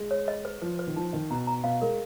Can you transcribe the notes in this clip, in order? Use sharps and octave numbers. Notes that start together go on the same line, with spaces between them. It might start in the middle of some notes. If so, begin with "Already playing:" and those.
Already playing: G#3
C#5
D#5
B4
F3 B4
B4
D#3
F3 D#4
D#3 D#5
B2 A#5
A#5
B2 F5
G#3 A#4